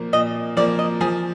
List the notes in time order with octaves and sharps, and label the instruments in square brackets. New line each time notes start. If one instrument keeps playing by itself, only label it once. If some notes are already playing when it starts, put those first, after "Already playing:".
Already playing: [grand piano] A#2 F3 A#3
[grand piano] A#2 [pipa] D#5
[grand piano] F3 A#3 [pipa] D5
[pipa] D#5
[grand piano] F3 [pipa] G#4